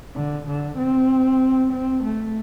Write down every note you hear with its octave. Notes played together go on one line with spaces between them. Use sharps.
D3
D3
C4
C4
A3